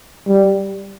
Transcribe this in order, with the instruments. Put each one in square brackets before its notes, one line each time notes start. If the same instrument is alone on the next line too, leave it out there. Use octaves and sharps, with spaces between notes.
[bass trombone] G3